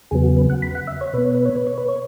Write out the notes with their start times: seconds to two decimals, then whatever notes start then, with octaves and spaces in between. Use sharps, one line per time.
0.11 E2 C#3 F#3 B3 G#4
0.24 F#4
0.37 B4
0.50 F#5
0.62 B5
0.75 F#5
0.87 E5
1.01 C#5
1.13 B2 B3 B4
1.24 C#5
1.34 B4
1.46 C#5
1.56 B4
1.67 C#5
1.78 B4
1.89 C#5